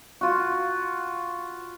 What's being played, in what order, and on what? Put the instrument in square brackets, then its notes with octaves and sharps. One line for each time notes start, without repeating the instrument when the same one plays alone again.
[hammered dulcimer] F4 F#4